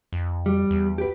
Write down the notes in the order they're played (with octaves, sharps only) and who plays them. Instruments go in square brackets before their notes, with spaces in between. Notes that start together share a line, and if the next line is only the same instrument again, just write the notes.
[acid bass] F2
[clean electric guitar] G3
[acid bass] E2
[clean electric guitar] G4 B4